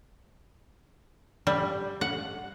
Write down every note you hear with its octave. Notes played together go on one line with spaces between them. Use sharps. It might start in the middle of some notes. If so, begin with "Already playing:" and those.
G3
F#5